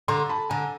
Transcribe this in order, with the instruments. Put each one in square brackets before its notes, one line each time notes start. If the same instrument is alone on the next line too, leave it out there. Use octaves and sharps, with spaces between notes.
[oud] D3 [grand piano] A#5 C6
[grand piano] A5 B5
[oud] D3 [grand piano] G#5 A#5